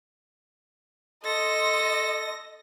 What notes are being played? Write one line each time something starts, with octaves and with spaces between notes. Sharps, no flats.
A4 D#5 C6 A#6